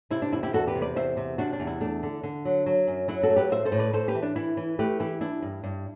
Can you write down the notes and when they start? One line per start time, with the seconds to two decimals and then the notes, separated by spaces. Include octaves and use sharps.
0.11 C3 E4
0.22 D4
0.32 E2 E4
0.43 E4 G4
0.53 E2 F#4 A4
0.67 G4 B4
0.75 C3
0.81 B4 D5
0.96 E2 C5 E5
1.17 C3
1.38 C3 D4 F#4
1.53 D4
1.60 E2
1.67 E4
1.81 A3 D4
2.03 D3
2.23 D3
2.45 F#3
2.66 F#3
2.87 F#2
3.08 F#3 E4
3.23 F#4 A4
3.30 A3
3.36 G4 B4
3.52 A2 C5 E5
3.65 A4 C5
3.72 A2
3.79 B4 D5
3.93 A2 A4 C5
4.08 G4 B4
4.15 E3
4.22 D4
4.36 E3 E4
4.57 E3
4.79 A3 G4 B4
5.00 E3 E4 G4
5.21 D4 E4
5.42 G2
5.64 G2